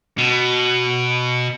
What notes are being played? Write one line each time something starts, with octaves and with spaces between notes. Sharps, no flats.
B2